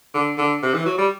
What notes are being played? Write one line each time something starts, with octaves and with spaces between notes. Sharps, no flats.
D3
D3
C3
E3
F#3
G3